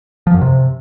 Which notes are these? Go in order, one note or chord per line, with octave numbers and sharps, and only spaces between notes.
F3
F#2
C3